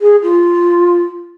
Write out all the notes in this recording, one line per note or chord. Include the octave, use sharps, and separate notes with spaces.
G#4
F4